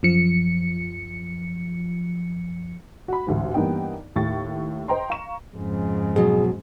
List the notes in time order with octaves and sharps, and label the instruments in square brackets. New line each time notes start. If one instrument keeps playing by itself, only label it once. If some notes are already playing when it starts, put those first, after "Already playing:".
[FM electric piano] F#2 F3 C#7
[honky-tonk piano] F#4 B5
A1 D2 G#2
G2 E3 A#3 B3 D#4 G5
D#2 A2 C#6 A6
C5 D#5 G5 A#5 C6
F5 A#5 C#6 E7
[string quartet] F2 G#2 C#3
[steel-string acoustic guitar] B2 F#3 [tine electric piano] G#4